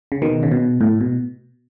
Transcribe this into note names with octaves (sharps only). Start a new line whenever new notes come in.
C#3
B2 D#3
C#3
B2
A2
B2